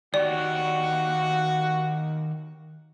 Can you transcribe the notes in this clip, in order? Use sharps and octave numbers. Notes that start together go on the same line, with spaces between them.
D#3 F#4 G4 C#5 D5